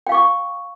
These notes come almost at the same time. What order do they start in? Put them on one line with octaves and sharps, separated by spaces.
G5 F5 C#6 D6